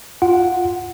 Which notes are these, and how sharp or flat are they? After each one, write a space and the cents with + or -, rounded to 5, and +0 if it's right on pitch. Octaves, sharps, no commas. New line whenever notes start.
F4 +0 F#5 +0